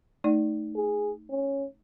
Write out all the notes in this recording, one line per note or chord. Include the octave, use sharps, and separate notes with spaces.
A3 D#4 D5
G#4
C#4